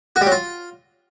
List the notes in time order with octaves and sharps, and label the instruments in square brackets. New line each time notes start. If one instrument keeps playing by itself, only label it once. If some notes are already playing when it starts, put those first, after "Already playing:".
[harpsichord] F#4
G3
F#3
F4